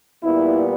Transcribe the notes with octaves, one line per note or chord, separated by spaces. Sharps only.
A#2 G3 B3 E4